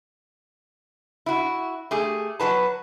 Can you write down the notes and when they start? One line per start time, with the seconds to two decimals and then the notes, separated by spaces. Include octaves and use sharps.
1.26 E4 F#4
1.91 A3 G4 G#4
2.40 F#3 F#4 B4 A5